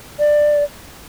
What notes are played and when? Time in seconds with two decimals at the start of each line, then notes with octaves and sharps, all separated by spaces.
0.19 D5